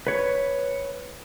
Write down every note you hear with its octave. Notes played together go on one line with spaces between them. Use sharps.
B4 C#5